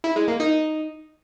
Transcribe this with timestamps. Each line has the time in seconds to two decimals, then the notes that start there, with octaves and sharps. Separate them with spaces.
0.04 E4
0.16 G#3
0.28 A#3
0.40 D#4